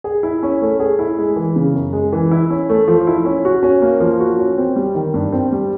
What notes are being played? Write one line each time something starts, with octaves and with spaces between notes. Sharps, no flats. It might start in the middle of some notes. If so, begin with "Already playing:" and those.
G#4
E4
C#4
A3
G#4
E4
G#3
E3
C#3
F#2
G#3
E3
E4
C#4
A3
F3
E4
C#4
F#4
C#4
A#3
F3
F#4
C#4
C4
G3
D#3
G2
C4
G3